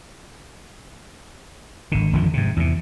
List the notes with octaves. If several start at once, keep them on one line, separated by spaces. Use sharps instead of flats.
G#1 D3
G#1 F2 D3 F3
G#2 C3
E2 C3